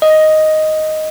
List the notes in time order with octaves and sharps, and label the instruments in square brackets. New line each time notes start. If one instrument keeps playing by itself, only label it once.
[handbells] D#5